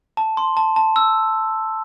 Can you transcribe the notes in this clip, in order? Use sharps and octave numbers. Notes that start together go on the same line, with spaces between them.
A5
C6
A5
A5
E6